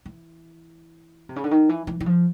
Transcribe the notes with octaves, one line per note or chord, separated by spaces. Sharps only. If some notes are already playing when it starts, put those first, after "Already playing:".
E3
C3
C#3
D3
D#3
E3
E3
E3
F3